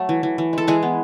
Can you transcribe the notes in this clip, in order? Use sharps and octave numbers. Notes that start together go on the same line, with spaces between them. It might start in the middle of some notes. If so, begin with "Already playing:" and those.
Already playing: F#3 A3
E3
E3
E3
G#3 A4
E3 G#3 G#4
B3